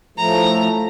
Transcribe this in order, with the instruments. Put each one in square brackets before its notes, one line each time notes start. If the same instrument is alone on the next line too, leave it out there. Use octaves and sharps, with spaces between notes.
[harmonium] A2 F3 A3 [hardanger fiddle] A#5